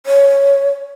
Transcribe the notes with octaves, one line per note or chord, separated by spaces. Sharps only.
C#5